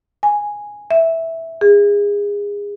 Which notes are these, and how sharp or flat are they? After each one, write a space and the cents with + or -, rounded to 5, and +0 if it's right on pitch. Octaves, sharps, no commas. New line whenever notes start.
G#5 -5
E5 -5
G#4 -25